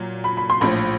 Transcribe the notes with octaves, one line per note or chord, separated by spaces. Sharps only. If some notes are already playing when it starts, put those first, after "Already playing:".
Already playing: A#2 F#3
B5
B5
C6
A#1 A2 F3 B5